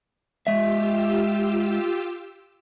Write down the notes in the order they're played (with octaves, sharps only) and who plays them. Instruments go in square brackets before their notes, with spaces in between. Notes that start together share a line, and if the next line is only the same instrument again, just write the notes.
[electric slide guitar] G#3 E5 [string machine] F4 G4 E6